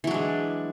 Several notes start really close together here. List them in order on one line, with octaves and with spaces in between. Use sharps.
E3 F#3 D4 G#3